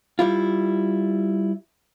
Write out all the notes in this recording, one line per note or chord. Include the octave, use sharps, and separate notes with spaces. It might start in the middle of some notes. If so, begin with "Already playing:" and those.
G3 E4 F4